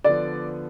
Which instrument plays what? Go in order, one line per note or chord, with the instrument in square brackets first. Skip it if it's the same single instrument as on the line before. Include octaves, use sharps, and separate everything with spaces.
[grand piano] D3 F3 B3 [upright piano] D5